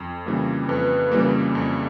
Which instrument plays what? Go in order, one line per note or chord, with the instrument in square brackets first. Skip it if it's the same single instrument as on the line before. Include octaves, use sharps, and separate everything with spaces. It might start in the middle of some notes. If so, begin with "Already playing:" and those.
Already playing: [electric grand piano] F2
C#3 E3 G3 A#3
[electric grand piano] F2 [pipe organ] B4
[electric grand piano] C#3 E3 G3 A#3
F2